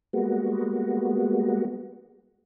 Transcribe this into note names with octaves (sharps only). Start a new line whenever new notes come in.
G3 G#3 A#3 B3 F#4